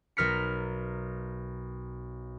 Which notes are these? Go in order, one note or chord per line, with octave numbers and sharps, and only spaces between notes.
B1 A#4 F6 B6 C#7